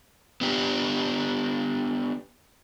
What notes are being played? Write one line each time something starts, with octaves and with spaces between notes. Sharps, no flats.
B3 D4 G4